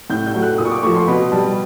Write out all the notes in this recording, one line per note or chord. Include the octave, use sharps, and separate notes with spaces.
A2 G6
G6
F#3 A3
F#6
A#2 D#6
C#6
D6
F3 A3 C#6
C6
B2 B5
G3 A5